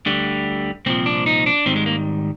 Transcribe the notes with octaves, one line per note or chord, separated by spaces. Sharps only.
D2 D3 G3
C2 A#2 F3 C4
D4
D#4
D4
G#2 D#3 G3 C4
G#3
A#3